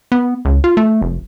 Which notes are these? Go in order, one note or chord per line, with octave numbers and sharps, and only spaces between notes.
B3
C#2
F4
A3
F1